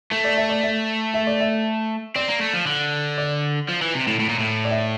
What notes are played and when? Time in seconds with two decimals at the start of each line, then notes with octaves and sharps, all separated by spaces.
0.12 A3
0.24 D5
0.37 E5
0.50 D5
0.63 E5
1.14 E5
1.27 D5
1.40 E5
2.16 C4 D5
2.29 A#3
2.41 A3
2.54 F3
2.67 D3
3.18 D5
3.68 F3
3.82 E3
3.94 C3
4.07 A2
4.19 A2
4.29 A#2
4.39 A2
4.65 D5
4.71 E5